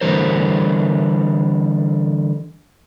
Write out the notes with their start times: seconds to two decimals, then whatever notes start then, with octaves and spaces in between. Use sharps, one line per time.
0.01 D3 E3 G3 A#4 C5